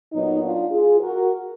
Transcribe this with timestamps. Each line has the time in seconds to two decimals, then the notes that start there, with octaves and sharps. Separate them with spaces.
0.13 A#2 F#3 B3 D#4
0.42 D4 F4
0.70 F4 G#4
1.00 F#4 A#4